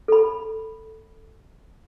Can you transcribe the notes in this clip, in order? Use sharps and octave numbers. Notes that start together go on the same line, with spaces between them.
A4 B5